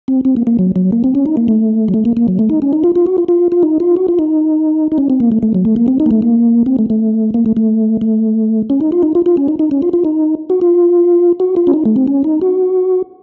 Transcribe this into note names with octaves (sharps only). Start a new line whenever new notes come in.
C4
C4
A#3
A#3
F#3
F#3
A#3
C4
C#4
D#4
A#3
A3
F#3
A3
A#3
A#3
F#3
A3
D#4
C#4
D#4
F4
F4
F#4
F4
F4
F4
D#4
F4
F#4
F4
D#4
D#4
C#4
C4
A#3
A3
A3
F#3
A3
A#3
C4
D#4
A#3
A3
A#3
C4
A3
A3
A#3
A3
A3
A3
C#4
D#4
F4
D#4
F4
F4
C#4
D#4
D#4
C#4
F4
F4
D#4
F#4
F4
F#4
F4
C#4
D#4
A3
C4
C#4
D#4
F#4